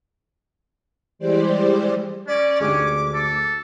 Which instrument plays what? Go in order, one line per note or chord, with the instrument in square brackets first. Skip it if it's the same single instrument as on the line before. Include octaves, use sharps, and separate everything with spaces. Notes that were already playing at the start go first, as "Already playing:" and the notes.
[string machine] E3 G3 G#3 G4 C5 D5
[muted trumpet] C#4 [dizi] D5
[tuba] D2 [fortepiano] G#3 D4 G4 [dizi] D6
[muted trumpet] A4